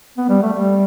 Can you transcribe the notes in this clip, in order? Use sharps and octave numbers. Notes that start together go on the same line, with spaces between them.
B3
G3
A3
G3